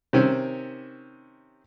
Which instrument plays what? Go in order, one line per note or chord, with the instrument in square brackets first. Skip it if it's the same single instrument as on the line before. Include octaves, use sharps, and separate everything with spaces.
[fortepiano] C3 D#3 C4 C#4